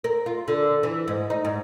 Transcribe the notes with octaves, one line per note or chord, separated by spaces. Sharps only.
A#4
F4
D3
E3
G#2
D#4
G#2